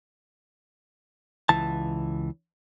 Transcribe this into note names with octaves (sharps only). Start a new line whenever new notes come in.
C#2 E3 A5